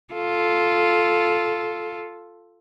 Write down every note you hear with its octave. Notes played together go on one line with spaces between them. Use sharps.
F4 A4